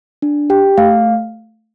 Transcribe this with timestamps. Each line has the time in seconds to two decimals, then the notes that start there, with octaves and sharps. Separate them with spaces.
0.22 D4
0.50 G4 G5
0.78 A3 F5